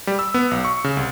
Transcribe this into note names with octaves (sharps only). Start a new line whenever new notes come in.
G3
E6
B3
B1
C#6
C#3
C2